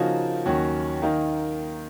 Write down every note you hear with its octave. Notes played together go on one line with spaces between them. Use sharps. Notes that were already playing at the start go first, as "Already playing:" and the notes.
Already playing: C#3 F3 A#3 D#4 F#4
D#2 D#3 F#3 C#4 F#4
D#3 A#3 D#4